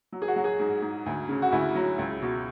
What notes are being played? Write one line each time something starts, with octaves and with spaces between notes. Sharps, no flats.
F#3
G#4
F#4
F#3
G#4
G#2
G#2
D2
C#3
F#4
D2 E4
F#3
C#2
B2